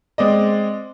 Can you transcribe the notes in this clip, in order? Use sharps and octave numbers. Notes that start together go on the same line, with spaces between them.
G#3 C4 D5 D#5